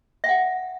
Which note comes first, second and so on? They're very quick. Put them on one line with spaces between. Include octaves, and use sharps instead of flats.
E5 G5 F#5